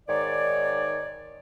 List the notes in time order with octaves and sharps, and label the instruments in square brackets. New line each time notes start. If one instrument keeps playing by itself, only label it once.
[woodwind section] G#2 D#3 C#5 D5